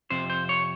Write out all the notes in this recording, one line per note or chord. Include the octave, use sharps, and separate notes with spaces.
F2 C3 C5
C5
C#5